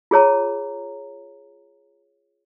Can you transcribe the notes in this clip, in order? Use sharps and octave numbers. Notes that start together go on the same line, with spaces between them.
F4 G#4 C#5 A#5